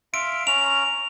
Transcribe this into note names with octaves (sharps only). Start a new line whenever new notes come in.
E5 F5 C6 D7
C#4 A#5 F7